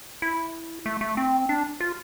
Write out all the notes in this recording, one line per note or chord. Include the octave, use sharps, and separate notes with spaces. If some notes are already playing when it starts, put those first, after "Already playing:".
E4
A3
A3
C4
D4
F4